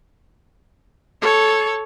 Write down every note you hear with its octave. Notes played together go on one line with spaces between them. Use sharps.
A4 C#5